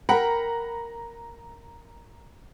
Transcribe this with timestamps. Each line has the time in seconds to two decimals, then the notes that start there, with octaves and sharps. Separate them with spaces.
0.09 A#4 F#5 G5 A#5 B5